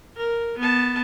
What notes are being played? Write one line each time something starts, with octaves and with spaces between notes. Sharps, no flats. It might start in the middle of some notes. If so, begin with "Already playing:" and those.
A#4
B3 A5